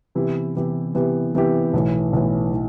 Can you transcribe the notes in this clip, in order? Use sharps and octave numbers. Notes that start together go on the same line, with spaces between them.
C3 E3 B3 E4 G4
C3 E3 B3 E4 G4
C3 E3 B3 E4 G4
C3 E3 B3 E4 G4
B1 A2 E3
B1 A2 E3
A2 E3